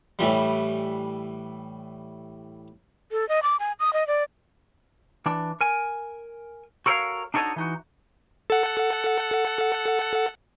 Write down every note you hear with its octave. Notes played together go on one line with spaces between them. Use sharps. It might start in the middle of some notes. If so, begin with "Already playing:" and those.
A2 E3 G3
A4
D#5
D6
G#5
D#6
D#5
D5
E3 D4
A#4 G#5
F#4 A4 A#4 C5 C#5 F5
D4 D#4 F#4 A4 C#5 D#5
E3 D#4 F#4
A4 F#5